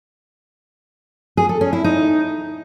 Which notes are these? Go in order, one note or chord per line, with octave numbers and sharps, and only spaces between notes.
G#4
A4
C#4
E4
D#4